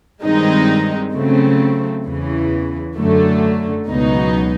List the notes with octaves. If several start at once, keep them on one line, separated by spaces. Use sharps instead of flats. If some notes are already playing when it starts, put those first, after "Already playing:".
G2 D#3 G#3 C4 D#4
C#3 F#3 A3 C4
E2 C#3 E3
F#2 D3 F#3 A3
C#2 B2 F#3 B3 D#4